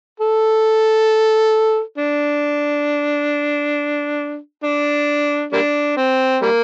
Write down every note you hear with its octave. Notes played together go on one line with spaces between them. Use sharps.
A4
D4
D4
G3 A#3 D4
C4
G3 A#3